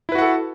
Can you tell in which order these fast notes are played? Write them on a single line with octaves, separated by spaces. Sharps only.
E4 B4 F#4 F#5 A4